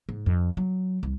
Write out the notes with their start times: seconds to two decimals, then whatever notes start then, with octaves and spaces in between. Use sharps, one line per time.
0.09 G#2
0.26 F2
0.57 F#3
1.03 C2